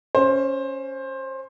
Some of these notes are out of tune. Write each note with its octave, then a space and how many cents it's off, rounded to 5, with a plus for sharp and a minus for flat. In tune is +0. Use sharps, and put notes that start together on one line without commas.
C#4 +0 C5 +20